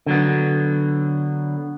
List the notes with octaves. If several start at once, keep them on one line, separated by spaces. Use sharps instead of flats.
D3 F#3 B3